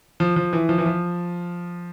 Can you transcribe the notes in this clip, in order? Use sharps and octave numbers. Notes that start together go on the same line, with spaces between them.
F3
F3
E3
F3
E3
F3